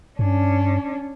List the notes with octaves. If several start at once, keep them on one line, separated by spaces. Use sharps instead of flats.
G2 C#4 D4